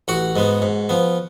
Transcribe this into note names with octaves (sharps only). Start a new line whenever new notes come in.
A1 F#4 F#5
G#2 G#3 B3
G#2
F3 B3